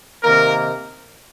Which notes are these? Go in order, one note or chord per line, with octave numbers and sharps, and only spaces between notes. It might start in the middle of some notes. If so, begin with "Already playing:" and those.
C3 D#3 A#3 D#4 A#4